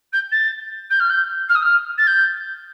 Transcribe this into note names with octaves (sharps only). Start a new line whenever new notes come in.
G6
A6
G6
F6
G6
F6
D#6
F6
A6
G6